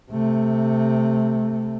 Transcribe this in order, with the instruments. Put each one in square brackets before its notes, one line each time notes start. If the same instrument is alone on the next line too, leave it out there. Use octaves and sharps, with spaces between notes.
[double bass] C3 A3